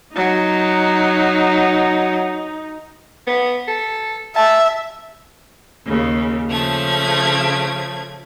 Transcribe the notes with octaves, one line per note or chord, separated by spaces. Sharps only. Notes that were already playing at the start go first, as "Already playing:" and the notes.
F#3 D#4
B3
A4
E5 A5
D#2 C#3
C#3 F3 A3 G#6